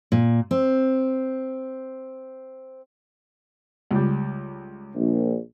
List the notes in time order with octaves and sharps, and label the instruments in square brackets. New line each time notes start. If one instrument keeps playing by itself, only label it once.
[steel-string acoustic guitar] A#2
C4
[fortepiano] C#2 G3
[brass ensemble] A#1